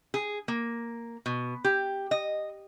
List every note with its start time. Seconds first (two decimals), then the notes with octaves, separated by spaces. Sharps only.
0.14 G#4
0.48 A#3
1.26 B2
1.64 G4
2.11 D#5